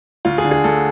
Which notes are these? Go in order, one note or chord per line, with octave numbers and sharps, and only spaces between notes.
D2 F4
G#4
D3
G#4
D2 A4